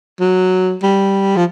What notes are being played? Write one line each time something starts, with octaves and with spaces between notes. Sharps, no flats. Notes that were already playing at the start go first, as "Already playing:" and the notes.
F#3
G3
F3